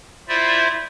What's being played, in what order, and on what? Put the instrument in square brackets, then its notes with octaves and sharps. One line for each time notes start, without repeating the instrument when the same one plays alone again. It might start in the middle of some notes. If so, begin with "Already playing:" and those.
[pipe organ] E4 F4 C5 D5 E5